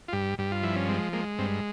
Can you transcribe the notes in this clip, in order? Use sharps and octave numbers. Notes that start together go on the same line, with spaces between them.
F4
G2 G4
G2 G4
F4
F3 E4
C#4
G#3 C4
G#3 A#3
G2 C4